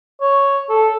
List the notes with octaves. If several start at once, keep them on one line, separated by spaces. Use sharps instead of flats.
C#5
A4